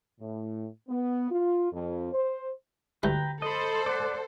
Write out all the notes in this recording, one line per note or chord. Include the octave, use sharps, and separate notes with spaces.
A2
B3
F4
F2
C5
D2 G2 E4 B4 G5 A#5
A4 C5 D#5 B5
D5 F#5